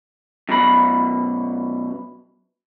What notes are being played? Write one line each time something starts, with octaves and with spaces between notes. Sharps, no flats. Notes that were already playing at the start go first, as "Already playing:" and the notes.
F#2 B2 B5